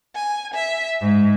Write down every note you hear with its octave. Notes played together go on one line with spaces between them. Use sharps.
G#5
E5
G#2